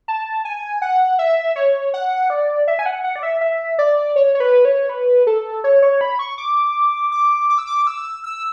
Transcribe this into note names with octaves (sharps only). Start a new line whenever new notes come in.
A5
G#5
F#5
E5
C#5
F#5
D5
E5
G#5
F#5
F#5
D5
E5
E5
D5
C#5
C#5
B4
C#5
B4
A4
C#5
C#5
B5
C#6
D6
D6
D6
E6
D6
E6
E6